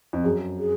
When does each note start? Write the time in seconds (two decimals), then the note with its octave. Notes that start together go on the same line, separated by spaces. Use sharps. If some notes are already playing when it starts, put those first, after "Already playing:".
0.13 F2
0.24 F#2 G#4
0.59 G#4